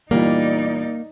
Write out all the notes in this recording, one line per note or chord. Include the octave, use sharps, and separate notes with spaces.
E2 A#2 G3 A#3 D#4 D5